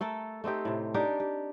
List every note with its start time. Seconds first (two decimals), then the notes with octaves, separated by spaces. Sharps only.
0.01 A3 A4 A#4
0.44 A3 C4 D#4 G4
0.65 A2 C3
0.94 D4 D#4 G4 A#4
1.20 G4